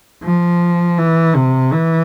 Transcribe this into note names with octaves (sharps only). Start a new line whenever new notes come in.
F3
E3
C3
E3